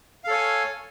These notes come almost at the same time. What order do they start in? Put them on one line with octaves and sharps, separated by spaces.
F5 A4 C#5 G#5